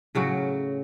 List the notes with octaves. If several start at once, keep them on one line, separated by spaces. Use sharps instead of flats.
A2 C#3 F#3 F#4